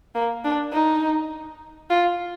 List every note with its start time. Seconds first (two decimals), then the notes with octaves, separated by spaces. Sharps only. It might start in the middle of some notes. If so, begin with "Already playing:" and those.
0.15 A#3
0.45 D4
0.73 D#4
1.90 F4